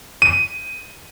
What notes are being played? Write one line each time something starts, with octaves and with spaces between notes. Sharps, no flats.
D#7